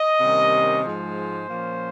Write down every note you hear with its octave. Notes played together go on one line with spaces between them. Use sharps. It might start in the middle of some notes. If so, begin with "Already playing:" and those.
Already playing: D#5
C3 D#3 G3 A#3 C#4
G#2 F3 G#3 C5
A#2 F3 A#3 C#4